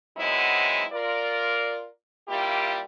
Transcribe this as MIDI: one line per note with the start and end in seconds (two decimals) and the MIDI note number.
0.17 0.84 54
0.17 0.84 56
0.17 0.84 59
0.17 0.84 60
0.17 0.84 63
0.17 0.84 64
0.93 1.88 65
0.93 1.88 70
0.93 1.88 74
2.28 2.81 55
2.28 2.81 58
2.28 2.81 64
2.28 2.81 65
2.28 2.81 67